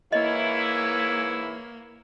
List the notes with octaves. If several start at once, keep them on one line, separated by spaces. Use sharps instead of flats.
G#2 E3 A#3 E4 C#5 D#5